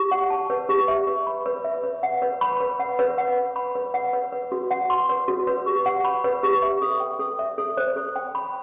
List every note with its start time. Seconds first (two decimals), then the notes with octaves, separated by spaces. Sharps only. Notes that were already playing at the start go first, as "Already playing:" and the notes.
Already playing: G4
0.11 F#5
0.30 A5
0.50 B4
0.69 G4
0.88 E5
1.07 B4
1.27 B5
1.46 B4
1.64 E5
1.84 B4
2.03 F#5
2.22 B4
2.41 B5
2.60 B4
2.80 F#5
2.99 B4
3.18 F#5
3.37 B4
3.56 B5
3.75 B4
3.94 F#5
4.13 B4
4.32 B4
4.52 F#4
4.71 F#5
4.90 C6
5.09 B4
5.28 F#4
5.47 B4
5.66 G4
5.86 F#5
6.05 B5
6.24 B4
6.43 G4
6.62 E5
6.82 A4
7.00 G5
7.19 A4
7.39 E5
7.58 A4
7.77 C5
7.96 A4
8.16 G5
8.35 B5